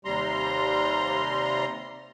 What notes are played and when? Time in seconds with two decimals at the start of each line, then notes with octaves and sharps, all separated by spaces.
0.05 D#2 C3 G3 A#5 C6